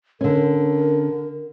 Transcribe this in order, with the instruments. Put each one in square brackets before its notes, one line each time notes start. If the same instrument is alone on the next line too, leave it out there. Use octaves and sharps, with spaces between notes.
[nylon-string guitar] D3 C#4 [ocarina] A#4